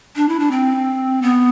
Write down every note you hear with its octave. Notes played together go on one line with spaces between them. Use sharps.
D4
E4
D4
C4
B3